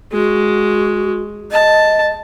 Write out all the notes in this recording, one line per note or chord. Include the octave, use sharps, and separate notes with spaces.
G#3 F#4
D#5 A5